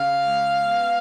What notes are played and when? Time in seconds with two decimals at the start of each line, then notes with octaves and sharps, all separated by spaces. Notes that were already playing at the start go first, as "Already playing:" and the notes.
Already playing: C#3 F5
0.24 G#3
0.59 B3